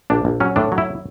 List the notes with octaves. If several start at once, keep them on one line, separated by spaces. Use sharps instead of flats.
A#1 D4
A#1
F#3 C#4
A2 D4
F#3
E4